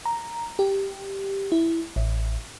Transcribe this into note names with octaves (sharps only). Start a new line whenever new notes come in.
A#5
G4
E4
A1